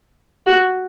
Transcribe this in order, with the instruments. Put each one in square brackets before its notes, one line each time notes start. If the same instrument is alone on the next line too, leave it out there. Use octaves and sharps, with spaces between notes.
[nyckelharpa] F#4